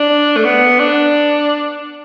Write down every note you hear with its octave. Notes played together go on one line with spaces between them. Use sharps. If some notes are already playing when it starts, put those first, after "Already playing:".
Already playing: D4
A3
B3
D4